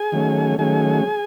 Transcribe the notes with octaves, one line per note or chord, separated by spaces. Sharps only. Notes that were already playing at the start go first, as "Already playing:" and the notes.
Already playing: G#4 G#5
D#3 F#3 A3 C#4
D#3 F#3 A3 C#4 G#4 G#5